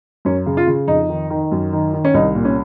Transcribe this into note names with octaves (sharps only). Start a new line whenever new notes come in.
F#2 C#4
C#3
F4
C#3
F2 D#4
D#3
D#3
F#2
D#3
D#3
C#4
C2 D#4
A#2
C#4